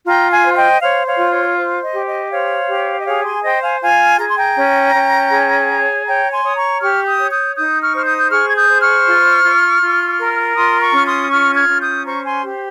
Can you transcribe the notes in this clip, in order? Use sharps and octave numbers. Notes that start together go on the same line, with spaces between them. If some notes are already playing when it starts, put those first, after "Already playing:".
F4 G5 A#5
F5 G#5
C5
F5
D#5 G5
C5 C#5 F5
C#5 F5
F4
C#5
C5
D#5
G4
D#5
C5 C#5 F5
G4
D#5
G#4 C#5 F5
G#5 C6
C5 D#5 G5
F5 G#5
F4 F5 G#5
G#4 A#5
C6
G5 A#5
C#4
C#4
G#4
C#5
C#5 G5 A#5
G#5 C6
C#5 D#6
A#5 C#6
G4 C#6 F6
D#6 G6
C#5
D#6 G6
D#4 D#6 G6
C#6 F6
C5 F6
D#6 G6
G6
G#4 C#6 F6
G#6
D#6 G6
C5
C#6 F6
F4
F4
F4
A#4
F4 C6 D#6
A#5 C#6
C#4 F6
C6 D#6
F4 C#6 F6
F6 G#6
C#4
D#6 G6
C5 A#5 C#6
G#5 C6
G4